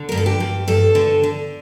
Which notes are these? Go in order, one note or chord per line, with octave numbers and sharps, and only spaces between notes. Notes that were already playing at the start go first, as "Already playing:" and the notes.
Already playing: D3
G2 A#4
A4
G4
G2
G2 A4
D3
D3